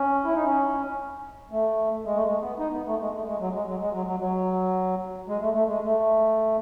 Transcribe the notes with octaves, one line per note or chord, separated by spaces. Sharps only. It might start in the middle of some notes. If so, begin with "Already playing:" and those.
Already playing: C#4
E4
D#4
C#4
A3
G#3
A3
G#3
B3
D#4
B3
A3
G#3
A3
G#3
F#3
G#3
F#3
G#3
F#3
F#3
F#3
G#3
A3
A3
G#3
A3